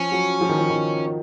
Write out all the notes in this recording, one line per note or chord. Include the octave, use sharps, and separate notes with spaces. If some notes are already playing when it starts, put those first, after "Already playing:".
Already playing: F3 C#4
F#3
F3
D#3
F3
D#3